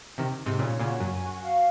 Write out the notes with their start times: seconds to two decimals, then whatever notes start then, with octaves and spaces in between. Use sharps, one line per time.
0.18 C3 D#3 D#4
0.40 D#4
0.46 G#2 C3
0.59 A#2 C#3 C#5
0.80 A#2 C#3 F#4
1.00 F#2 G#5
1.21 F#4
1.42 F5